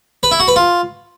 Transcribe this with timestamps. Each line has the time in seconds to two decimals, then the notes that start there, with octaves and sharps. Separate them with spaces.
0.23 B4
0.31 E4
0.40 F#4
0.48 B4
0.56 F4